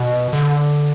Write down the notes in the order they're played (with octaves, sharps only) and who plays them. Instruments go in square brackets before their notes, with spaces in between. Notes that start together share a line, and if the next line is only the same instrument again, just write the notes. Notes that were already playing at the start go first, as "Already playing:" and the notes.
Already playing: [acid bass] B2
D3